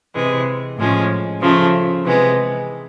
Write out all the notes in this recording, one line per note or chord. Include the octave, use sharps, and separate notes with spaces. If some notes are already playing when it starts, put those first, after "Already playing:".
C3 E3 G#3
A2 F3 G#3 C#4
C#3 F3 A3
C3 E3 G#3 B3